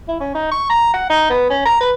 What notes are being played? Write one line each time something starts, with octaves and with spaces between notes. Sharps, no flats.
E4
C#4
D#4
C#6
A#5
F#5
D#4
B3
C#4
A#5
B4